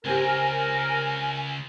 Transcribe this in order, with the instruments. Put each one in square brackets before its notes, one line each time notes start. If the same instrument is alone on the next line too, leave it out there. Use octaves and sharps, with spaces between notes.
[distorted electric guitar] C#2 [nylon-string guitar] C4 G4 [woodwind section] A#4 [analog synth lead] G#5